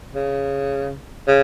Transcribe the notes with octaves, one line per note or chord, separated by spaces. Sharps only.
C#3
C#3